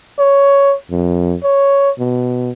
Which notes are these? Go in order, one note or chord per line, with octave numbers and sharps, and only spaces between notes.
C#5
F2
C#5
B2